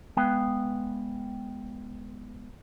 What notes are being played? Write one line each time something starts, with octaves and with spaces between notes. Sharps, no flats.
G#3 B3 B4 F5 G5